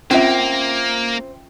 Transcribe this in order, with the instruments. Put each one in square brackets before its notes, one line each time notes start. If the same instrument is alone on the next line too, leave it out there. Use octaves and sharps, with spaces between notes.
[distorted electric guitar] A#3 [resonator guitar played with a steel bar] C4 [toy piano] C#4 F4 E5